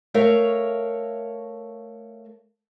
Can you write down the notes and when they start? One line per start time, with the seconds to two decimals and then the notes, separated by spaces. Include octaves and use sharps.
0.14 A3 A#4 C#5 F5